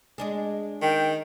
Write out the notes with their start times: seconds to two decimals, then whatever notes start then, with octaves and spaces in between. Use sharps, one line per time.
0.18 G#3 D4 G#4
0.82 D#3 G5